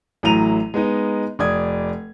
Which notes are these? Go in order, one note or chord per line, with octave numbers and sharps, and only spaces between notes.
A1 A2 F#3 A#5 D#7 F7
G#3 B3 D#4
F1 D5 D#6 G#6